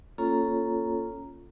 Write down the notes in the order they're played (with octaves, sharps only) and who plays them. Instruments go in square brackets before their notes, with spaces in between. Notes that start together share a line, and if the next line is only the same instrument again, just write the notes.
[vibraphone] A#3 C#4 F4 A4 C#5 A#5